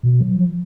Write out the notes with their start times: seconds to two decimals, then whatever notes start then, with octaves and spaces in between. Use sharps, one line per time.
0.03 B2
0.21 F#3
0.36 F3